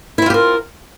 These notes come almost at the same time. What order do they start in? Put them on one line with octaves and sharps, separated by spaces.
E4 C4 F4 G4 A#4